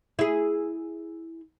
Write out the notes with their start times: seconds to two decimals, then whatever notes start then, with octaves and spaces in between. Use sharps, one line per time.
0.19 E4 G#4